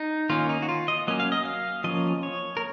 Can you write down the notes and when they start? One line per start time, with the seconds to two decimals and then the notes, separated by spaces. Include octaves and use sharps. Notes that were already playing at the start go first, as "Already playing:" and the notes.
Already playing: D#4
0.30 D#3 A#3 C#4 F4
0.49 D#4
0.62 F#4
0.69 F4
0.88 D#5
1.07 F#3 A#3 C#4 D#5
1.20 F5
1.32 D#5
1.45 F5
1.84 F3 A#3 C#4 D#5
2.23 C#5
2.57 A#4